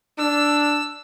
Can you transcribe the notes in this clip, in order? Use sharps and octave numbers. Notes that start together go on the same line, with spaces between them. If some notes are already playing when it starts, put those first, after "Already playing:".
D4 E6